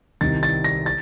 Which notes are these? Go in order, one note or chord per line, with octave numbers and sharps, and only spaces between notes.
C2 C3 D#3 A6
A6
A#6
A6